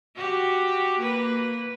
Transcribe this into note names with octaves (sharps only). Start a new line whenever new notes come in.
F#4 G4
A#3 B4